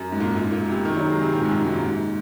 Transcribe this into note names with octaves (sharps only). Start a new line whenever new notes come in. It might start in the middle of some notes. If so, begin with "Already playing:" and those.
Already playing: F#2
G#2
A#2
G#2
A#2
A#2
C3
D#3
F#3
G#3
C3
A#2
G#2
F#2
G#2
A#2
G#2